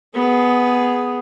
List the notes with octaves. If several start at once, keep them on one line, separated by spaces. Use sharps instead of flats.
B3 G#4